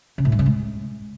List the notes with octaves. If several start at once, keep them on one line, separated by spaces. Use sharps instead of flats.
C#3
A2
G2
C#3
G#3